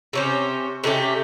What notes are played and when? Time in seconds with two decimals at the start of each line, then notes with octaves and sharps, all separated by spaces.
0.13 C3 C#4 C5
0.84 C3 A3 C#4 G4